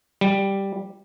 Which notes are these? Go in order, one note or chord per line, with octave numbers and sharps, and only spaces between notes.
G3